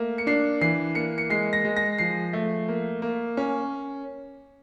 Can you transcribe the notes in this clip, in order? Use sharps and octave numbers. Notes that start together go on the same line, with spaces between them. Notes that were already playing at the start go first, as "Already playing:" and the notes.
Already playing: A3 A#3
C#7
D4 C7
E3 C7
A#3 C#7
C#7
G#3 C7
A#6
G#3
A#6
F3 C7
A3
A#3
A#3
C#4